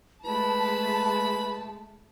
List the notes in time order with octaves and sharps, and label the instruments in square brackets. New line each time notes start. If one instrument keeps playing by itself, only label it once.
[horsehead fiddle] G#3 A3 [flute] B4 [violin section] A5 [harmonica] B5